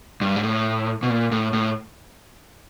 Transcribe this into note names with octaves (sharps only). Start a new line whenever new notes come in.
G2
G#2
A2
B2
A#2
A2
A2